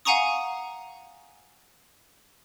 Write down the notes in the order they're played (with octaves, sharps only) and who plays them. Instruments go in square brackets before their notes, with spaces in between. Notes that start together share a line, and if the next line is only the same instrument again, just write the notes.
[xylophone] F5 F#5 G#5 A#5 C#6 D#6